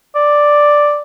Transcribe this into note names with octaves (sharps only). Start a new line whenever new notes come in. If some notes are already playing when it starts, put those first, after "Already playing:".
D5